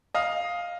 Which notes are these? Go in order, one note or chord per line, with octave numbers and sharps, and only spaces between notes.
D#5 F5